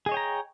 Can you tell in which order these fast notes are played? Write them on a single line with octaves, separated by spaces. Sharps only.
G#4 D#5 C#5 G5 A#5